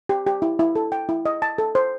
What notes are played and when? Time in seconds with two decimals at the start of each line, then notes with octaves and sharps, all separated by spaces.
0.09 G4
0.27 G4
0.42 E4
0.59 E4
0.76 A4
0.92 G5
1.09 E4
1.26 D#5
1.42 A5
1.58 A4
1.75 C5